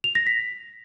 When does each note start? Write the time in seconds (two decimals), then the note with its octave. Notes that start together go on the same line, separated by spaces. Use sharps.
0.04 F7
0.15 A#6
0.27 B6